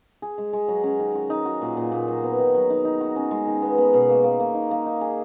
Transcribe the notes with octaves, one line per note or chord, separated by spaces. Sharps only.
G#4
G#3
G#3
F#3
C#4
D#3
F#4
D#4
F#4
A#2
A#2
A#2
F#3
B3
D#3
F#3
D#4
D#4
F#4
C#4
G#3
D#3
B3
B3
B2
A#3
A#3
A#3
D#4
A#3
D#4
G#4